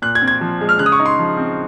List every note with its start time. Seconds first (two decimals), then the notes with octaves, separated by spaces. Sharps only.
0.02 A#2 F#6
0.15 G#6
0.22 C4
0.28 G#6
0.41 F3
0.61 G#3
0.69 F6
0.79 C#3 F#6
0.86 D#6
0.92 C#6
1.00 D#4
1.06 C6
1.19 F3
1.37 C4